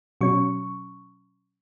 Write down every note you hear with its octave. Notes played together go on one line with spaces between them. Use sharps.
B2 F#3 C#4 C#6